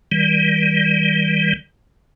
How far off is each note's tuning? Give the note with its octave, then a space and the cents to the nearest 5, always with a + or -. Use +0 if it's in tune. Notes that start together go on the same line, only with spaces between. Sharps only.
D#3 +45 G3 +0